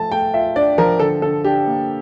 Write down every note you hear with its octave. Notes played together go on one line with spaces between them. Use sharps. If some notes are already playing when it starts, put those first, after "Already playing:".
Already playing: F3 A3 A5
A3 G5
F4 E5
D4 D5
F3 A#4
D3 A4
D3 A4
D4 G4
A#3